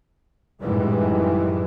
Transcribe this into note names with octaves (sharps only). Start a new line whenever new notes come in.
F#2 A2 D#3 E3 G3 G#3